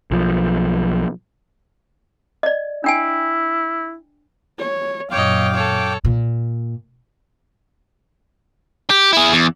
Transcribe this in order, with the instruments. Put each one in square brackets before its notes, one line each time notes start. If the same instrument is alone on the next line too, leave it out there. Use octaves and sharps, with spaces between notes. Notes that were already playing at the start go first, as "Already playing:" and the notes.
[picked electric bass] B1 F3
[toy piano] D5 D#5
[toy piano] D4 G5 G#5 [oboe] E4
[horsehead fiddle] C#5
[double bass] F#2 A#2 [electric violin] C#5 D#5 [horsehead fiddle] F5 [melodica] G5 D6
[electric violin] A4 C#5
[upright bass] A#2
[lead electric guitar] G4
E4 G#4
E2